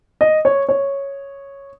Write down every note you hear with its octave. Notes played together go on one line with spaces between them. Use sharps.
D#5
C#5
C#5